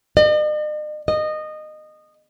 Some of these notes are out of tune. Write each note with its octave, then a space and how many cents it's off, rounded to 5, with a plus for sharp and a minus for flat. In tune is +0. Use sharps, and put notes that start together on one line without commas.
D#5 -45
D#5 -20